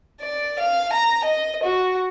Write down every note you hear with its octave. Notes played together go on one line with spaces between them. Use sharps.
D5
F5
A#5
D#5
F#4